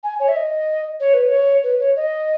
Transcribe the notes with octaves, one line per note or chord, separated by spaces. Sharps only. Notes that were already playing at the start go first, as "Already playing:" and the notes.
G#5
C#5
E5
D#5
C#5
B4
C#5
B4
C#5
D#5